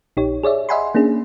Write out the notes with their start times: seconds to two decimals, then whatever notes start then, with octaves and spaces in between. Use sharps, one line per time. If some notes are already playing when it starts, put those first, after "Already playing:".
0.17 A#1 D#4 G4 C#5
0.43 G#4 C#5 D5 E5
0.69 D#5 E5 F#5 G#5 B5 C6
0.95 A#3 C#4 D4 G#4